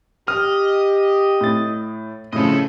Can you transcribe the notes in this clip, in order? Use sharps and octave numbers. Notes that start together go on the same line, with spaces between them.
G4 D#5 F6
A2 A6
A2 C#3 F3 A4 D#5